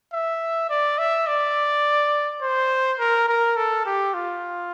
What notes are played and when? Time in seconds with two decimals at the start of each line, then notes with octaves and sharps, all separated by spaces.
0.13 E5
0.70 D5
0.99 E5
1.27 D5
2.42 C5
2.99 A#4
3.28 A#4
3.57 A4
3.86 G4
4.14 F4